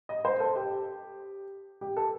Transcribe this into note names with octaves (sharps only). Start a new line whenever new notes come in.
D#5
C5
A4
G4
G4
A4